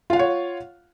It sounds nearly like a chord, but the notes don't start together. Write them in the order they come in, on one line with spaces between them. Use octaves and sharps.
F4 F5 F#5 C#5